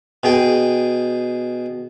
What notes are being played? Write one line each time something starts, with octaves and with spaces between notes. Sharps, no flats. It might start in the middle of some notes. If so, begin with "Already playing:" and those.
B2 G#4 G5